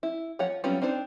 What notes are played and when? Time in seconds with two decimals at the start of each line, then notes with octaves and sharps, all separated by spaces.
0.03 E4
0.39 F3 C#5 F#5
0.64 F#3 G3 B3 C#4 F4
0.82 C4 D4 D#4 C5